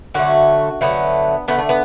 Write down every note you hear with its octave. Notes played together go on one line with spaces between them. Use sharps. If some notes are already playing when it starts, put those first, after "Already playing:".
D3 F#3 A3 F#4
D3 F#3 A3 B3
D3 A3 B3
A3
B3